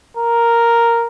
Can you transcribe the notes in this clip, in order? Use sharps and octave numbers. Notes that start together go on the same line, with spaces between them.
A#4